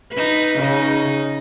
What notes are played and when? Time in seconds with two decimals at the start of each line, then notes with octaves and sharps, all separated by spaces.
0.13 D#4 B4
0.58 C#3 D#4